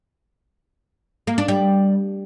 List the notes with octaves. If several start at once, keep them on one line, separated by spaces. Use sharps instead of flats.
A#3
D4
G3